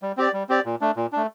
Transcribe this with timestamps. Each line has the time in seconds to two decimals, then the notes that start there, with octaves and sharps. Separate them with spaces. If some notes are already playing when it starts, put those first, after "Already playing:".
0.02 G3
0.17 C4 G4 D5
0.33 G3
0.49 C4 G4 D5
0.66 A#2
0.81 A3 D4
0.96 A#2
1.12 A3 D4